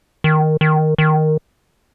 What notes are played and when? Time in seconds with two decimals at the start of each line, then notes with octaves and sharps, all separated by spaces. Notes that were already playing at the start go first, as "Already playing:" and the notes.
0.24 D#3
0.61 D#3
0.98 D#3